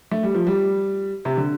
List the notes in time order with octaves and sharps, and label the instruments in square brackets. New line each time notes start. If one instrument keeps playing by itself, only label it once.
[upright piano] A3
G3
F3
G3
C3
D3